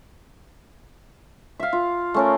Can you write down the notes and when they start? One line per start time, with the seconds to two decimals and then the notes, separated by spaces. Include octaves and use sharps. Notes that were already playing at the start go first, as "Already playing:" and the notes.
1.60 E5 F5
1.73 F4
2.14 A3 C#4 A#4